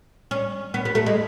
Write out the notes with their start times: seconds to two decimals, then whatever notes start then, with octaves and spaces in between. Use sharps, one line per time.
0.31 C#4
0.74 B3
0.85 B3
0.95 A3
1.06 G#3